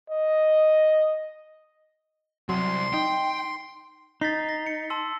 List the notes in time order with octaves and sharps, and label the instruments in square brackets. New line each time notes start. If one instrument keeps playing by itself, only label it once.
[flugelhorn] D#5
[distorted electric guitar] C2 [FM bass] F#3 [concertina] C6
[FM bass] D#4 [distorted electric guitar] G5
[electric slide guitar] D#4 [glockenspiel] A6 B6 C7
[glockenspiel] A#6
C#7
A5 C6 E6